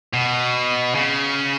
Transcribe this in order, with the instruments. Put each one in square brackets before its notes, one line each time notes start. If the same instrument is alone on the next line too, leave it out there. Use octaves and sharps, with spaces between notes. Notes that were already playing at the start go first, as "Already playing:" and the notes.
[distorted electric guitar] B2
C#3